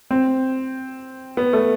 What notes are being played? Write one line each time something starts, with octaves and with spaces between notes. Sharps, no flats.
C4
B3
A3